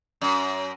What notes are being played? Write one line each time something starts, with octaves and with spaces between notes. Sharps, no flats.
F#2